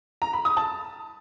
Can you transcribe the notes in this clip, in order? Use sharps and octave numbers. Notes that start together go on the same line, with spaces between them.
A#5
B5
D#6
A5